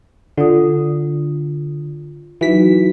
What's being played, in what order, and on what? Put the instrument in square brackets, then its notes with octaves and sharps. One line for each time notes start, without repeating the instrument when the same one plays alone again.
[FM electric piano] D3 [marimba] F4 D5 D#6
[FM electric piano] E3 B6 [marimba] F#3 D#4 F#4